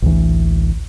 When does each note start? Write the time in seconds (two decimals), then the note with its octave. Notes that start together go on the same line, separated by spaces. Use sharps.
0.02 A1 D2 E3